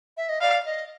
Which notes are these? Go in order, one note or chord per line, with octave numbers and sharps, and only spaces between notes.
E5
D#5
D5 F5
D#5